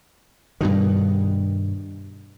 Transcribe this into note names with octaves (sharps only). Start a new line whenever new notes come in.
G2 B2 D#3